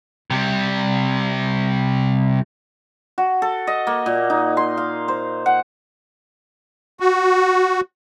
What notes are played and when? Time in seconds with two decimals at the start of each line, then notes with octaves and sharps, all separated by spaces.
0.30 C3 G3
3.18 F#4
3.42 A4
3.67 D#5
3.87 A#3
4.06 A#2
4.30 D#4
4.57 C6
4.77 F5
5.08 C5
5.46 F#5
7.00 F#4